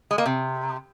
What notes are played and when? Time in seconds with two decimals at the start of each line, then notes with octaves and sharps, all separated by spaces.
0.11 G#3
0.18 A#3
0.26 C3